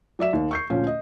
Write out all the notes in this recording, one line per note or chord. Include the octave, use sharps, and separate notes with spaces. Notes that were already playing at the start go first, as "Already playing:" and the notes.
F#3 D5 E5 E7
D#2
C#6 G6 C7
D2 A#2 F3 C#4
D#5